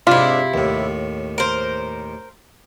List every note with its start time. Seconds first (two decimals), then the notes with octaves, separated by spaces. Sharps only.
0.07 G#2 C3 D4 E4 F4
0.54 D#2 A2
1.38 A#4 C5